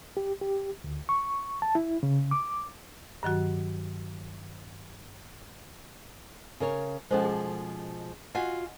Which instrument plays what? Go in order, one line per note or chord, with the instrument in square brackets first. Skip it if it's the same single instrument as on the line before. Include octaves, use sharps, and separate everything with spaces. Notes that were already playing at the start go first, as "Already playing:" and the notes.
[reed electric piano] G4
G4
D2
C#6
A5
E4
C#3
D6
[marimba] G2 D#3 F#3 F#4
[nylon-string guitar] C#3 A#4 C#5
[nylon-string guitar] B2 F3 G#3 [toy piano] C#4 A4 C5
[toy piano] G#4
[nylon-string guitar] F4 F#4 G#5 [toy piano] D#5 F#5